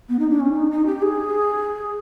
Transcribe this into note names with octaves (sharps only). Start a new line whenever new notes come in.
B3
D#4
D4
C#4
D#4
D#4
G4
G#4